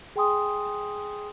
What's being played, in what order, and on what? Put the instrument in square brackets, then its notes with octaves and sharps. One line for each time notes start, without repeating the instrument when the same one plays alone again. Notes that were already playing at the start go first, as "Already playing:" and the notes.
[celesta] G#4 G5 G#5 C6 D#6